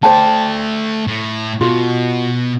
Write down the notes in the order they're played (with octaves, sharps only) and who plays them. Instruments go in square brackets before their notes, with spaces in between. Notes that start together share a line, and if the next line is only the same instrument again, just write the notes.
[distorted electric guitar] A3 D5 [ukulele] C5 G5 A5
[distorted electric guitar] A2
[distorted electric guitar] B2 [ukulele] F4 F#4